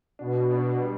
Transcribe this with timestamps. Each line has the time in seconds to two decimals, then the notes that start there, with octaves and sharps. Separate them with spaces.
0.19 B2 D4
0.51 D4
0.82 G3